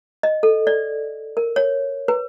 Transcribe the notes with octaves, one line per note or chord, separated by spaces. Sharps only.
D#5
A4
D5
A#4
C#5
B4